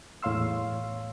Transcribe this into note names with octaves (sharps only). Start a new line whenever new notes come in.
E2 A2 C#5 F5 C6 E6